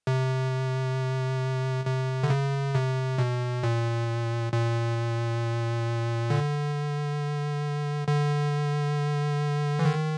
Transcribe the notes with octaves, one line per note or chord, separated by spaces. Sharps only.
C3
C3
D3
C#3
C3
B2
A#2
A#2
D3
D3
E3
D#3